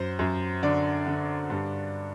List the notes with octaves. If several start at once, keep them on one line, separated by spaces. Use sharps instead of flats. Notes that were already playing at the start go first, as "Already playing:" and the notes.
Already playing: F#2 C5
F#2
D3 D5
D3
G2